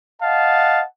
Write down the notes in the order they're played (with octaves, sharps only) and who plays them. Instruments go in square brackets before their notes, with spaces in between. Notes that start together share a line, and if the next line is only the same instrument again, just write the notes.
[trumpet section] D#5 F5 F#5 A5